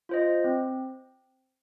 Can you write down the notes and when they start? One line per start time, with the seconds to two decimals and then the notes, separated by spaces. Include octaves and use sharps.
0.09 F4 C5 D#5
0.44 C4